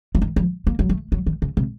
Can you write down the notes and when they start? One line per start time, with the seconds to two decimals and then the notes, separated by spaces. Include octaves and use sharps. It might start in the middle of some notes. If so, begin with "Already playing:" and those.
0.15 F3
0.22 D#3
0.36 F3
0.67 A#3
0.79 F#3
0.89 A3
1.12 F#3
1.26 D#3
1.42 C#3
1.57 C3